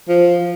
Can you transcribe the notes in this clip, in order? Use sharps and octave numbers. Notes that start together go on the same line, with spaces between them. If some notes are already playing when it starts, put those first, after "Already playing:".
F3